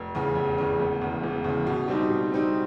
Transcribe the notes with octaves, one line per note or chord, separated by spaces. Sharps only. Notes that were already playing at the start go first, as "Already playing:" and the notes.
Already playing: F1
E2 C#3
F1
E2 C#3
E1
E2 C#3
E1
E2 C#3
B2
G3 C4 D#4
B2
G3 C4 D#4